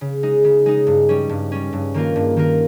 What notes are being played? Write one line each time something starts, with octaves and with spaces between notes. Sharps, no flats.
C#3
G#3 D#4
C#3
G#3 D#4
G2
G3 C#4
G2
G3 C#4
G2
D#3 A#3 F4 A#4
G2
D#3 A#3 F4 A#4